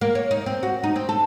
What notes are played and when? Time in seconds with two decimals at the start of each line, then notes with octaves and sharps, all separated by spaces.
0.01 A#3
0.15 C#5
0.31 D#4
0.46 C4
0.63 F#4
0.84 D#4
0.96 C4
1.09 A4